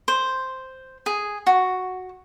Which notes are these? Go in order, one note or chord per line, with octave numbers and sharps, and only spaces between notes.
C5
G#4
F#4